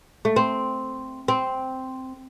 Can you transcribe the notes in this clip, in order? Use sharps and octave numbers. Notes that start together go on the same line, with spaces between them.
A3
C4
C4